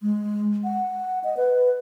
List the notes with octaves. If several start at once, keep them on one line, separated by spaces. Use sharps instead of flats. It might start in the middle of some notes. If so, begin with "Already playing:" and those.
G#3
F#5
D#5
B4